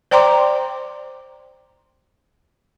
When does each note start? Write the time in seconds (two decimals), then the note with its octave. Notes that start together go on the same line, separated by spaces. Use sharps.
0.11 C5 D5 G5 A#5 C6 D6